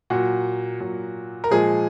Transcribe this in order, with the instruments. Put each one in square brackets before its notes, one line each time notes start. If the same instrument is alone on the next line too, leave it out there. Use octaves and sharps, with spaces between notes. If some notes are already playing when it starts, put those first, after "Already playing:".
[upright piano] A#2 F#3 F#4
A#2 F#3
A#4
A#2 F3 G#3 G#4